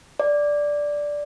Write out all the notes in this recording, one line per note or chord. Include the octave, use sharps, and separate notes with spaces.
D5